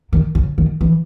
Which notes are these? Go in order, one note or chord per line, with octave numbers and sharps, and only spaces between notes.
D#3
C#3
D#3
E3